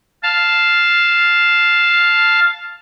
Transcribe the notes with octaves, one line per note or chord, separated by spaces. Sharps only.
F5 A5